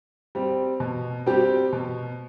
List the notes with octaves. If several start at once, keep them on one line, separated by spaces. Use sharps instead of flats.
G3 C4
B2
G3 C4 G4
B2